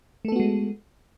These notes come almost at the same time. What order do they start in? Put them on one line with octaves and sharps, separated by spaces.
A3 A4 B3 F#4 G#3